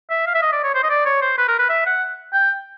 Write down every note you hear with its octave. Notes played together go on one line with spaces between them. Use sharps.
E5
F5
E5
D#5
D5
C#5
C5
D#5
D5
C#5
C5
B4
A#4
B4
E5
F#5
G5